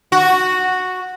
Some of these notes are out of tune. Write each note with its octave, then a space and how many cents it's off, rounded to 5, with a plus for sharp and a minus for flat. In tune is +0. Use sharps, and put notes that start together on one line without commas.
F#4 -5